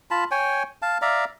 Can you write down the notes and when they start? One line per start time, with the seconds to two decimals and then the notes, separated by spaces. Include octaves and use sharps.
0.11 F4 A5 B5
0.31 C#5 G5 G#5
0.82 F5 A5
1.02 D5 E5 F5 A#5